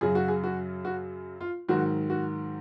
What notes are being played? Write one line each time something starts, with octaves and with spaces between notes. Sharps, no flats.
F#2 C#3 F#3 G#4
F#4
G#4
F#4
F#4
F4
G#2 D#3 F#3 F#4
F#4